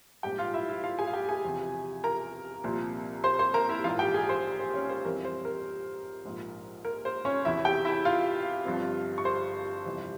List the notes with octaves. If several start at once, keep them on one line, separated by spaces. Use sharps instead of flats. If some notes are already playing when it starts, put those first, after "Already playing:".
A#1 G#2 G3 G4 G5
F4 F5
E4 E5
E4 E5
F4 F5
G#4 G#5
F5
G4 G5
G#4 G#5
E1 E2 C3 F3
A#4 A#5
C2 A#2 F3 C4
C5 C6
C5 C6
A#4 A#5
E4 E5
A#1 G#2 E3 F4 F5
G4 G5
G#4 G#5
C5 C6
C5
C#4 C#5
C5
F2 E3 G3 C4 A#4
C5
A#4
A#1 G#2 F3
A#4
C5
C#4 C#5
E1 E2 C3 E4 E5
G4 G5
E4 E5
F4 F5
G1 G2 F3 C4
C#6
C5 C6
G1 F2 C3 E3 G3